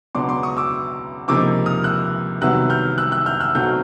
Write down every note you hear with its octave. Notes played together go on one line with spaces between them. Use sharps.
C#2 B2 F#3 B3 D4 C6 D6
C6 D6
C#6 D#6
D6 E6
C#2 C3 F3 A#3 D#4 D6 E6
D#6 F6
E6 F#6
C2 C3 D#3 F#3 B3 E6 F#6
F6 G6
E6 F#6
E6 F#6
F6 G6
E6 F#6
B1 B2 F#3 A3 C4 F6 G6